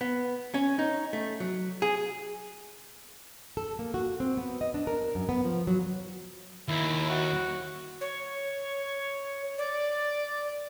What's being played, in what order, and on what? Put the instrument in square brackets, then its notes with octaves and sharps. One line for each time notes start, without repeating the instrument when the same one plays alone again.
[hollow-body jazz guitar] B3
C#4
D#4
A3
F#3
G#4
[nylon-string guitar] A4
A#3
F#4
C4
B3
D#5
D4
A#4
F#2
B3
F3
F#3
[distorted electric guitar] D#2 [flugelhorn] E4
[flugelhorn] F#4
[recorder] C#5
D5